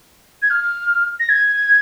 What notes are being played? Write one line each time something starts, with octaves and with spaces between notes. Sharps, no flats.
G#6
F6
A#6
G#6